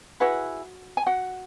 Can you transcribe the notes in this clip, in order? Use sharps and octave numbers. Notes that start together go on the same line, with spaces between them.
E4 F#4 G#4 B4 F#5
G#5
F#4 F#5